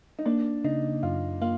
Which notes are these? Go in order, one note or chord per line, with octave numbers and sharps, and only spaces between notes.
D#4
A#3 D4
C#3 D#4
F#2 F4
A#3 F4